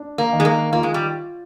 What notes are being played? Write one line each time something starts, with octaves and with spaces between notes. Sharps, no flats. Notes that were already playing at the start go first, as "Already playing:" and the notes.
Already playing: D4
A#3
D#3
G#3
A#3
A#3 F4
G#3
G3